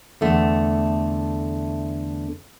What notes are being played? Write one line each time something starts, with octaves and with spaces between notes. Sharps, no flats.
E2 D3 A3